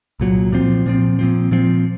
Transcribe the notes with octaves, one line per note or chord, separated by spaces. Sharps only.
C2 A#2 F#3
A#2 F3 C4
A#2 F3 C4
A#2 F3 C4
A#2 F3 C4